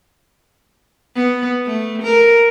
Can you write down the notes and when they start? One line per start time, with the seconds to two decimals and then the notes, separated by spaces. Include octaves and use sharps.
1.15 B3
1.66 A3
2.03 A#4